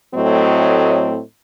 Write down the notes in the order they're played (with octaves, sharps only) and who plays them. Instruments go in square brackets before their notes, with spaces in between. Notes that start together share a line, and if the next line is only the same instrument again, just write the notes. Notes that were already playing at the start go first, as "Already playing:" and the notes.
[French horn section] A2 F#3 A3 C4 C#5 D#5